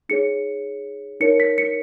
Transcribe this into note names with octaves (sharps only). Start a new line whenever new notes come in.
D#4 G#4 C#5 C#7
D#4 A#4 C#5 C#7
B6
C#7